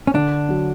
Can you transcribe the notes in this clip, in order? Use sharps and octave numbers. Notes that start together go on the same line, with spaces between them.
C#4
D3 D4
F#3